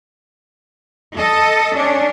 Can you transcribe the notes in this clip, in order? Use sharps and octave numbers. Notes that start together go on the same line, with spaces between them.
A4 D#5
C#4 D4